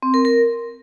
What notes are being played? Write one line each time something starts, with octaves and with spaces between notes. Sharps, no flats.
C4
A#4
A#4